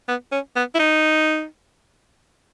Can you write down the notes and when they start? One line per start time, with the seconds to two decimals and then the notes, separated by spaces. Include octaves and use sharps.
0.08 B3
0.32 C#4
0.56 B3
0.75 E4
0.79 D#4